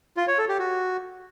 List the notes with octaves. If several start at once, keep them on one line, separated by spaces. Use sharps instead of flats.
F4
C#5
A4
G4
F#4